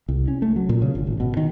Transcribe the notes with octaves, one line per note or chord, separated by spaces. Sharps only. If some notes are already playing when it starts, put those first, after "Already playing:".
C2
C#4
A3
F#3
A#2
C#3
G1
G#1
B2
D#3